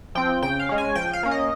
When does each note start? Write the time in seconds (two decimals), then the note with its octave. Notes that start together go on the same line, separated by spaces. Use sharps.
0.15 F3 C4 G5
0.42 C#3 G5
0.59 F5
0.69 G#3 C#4
0.78 G#5
0.95 F3 G5
1.13 F5
1.23 A#3 C#4
1.31 D#5